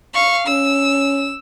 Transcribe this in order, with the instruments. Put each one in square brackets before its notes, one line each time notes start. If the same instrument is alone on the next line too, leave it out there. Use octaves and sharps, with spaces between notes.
[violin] F5 C#6
[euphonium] C#4 [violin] E6